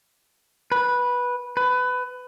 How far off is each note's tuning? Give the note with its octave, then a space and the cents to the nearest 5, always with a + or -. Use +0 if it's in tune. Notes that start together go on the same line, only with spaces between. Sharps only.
B4 -10
B4 +20